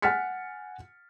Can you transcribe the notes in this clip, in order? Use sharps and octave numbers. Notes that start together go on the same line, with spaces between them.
F#5 G#5 F6 A6 B6 C#7